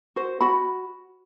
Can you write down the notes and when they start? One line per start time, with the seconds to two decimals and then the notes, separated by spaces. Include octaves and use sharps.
0.16 F#4 C5
0.41 F#4 B5